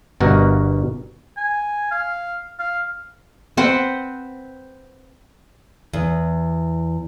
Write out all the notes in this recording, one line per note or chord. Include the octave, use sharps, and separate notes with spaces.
G1 G2 B2 F#4 A#4
G#5
F5
F5
C4 B4 C5 F#5
E2